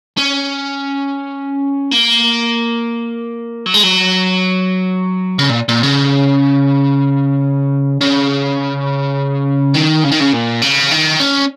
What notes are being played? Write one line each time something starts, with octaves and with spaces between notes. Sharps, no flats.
C#4
A#3
F#3
G#3
F#3
C#3
A#2
A#2
C#3
C#3
D#3
C#3
D#3
C#3
A#2
C#3
D#3
C#4